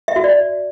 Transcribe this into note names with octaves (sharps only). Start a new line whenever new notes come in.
E5
F#4
D5